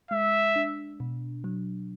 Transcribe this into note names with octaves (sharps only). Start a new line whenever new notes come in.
G#3 E5
D4
B2
F#3